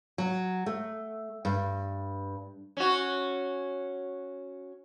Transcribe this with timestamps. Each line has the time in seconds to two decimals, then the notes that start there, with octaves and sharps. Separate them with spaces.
0.18 F#3
0.66 A3
1.45 G2
2.77 C#4 F#4